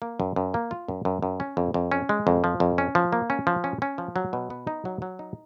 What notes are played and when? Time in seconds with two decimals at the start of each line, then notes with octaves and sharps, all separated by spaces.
0.02 A#3
0.20 F#2
0.36 F#2
0.54 A#3
0.71 F4
0.88 F#2
1.05 F#2
1.23 F#2
1.40 C#4
1.57 F2
1.74 F2
1.92 C#4
2.09 G#3
2.27 F2
2.44 F3
2.60 F2
2.78 C#4
2.95 F3
3.12 A#3
3.30 C#4
3.47 F3
3.64 C#4
3.82 C#4
3.98 F3
4.16 F#3
4.33 B2
4.50 B3
4.67 D#4
4.85 F#3
5.02 F#3
5.19 D#4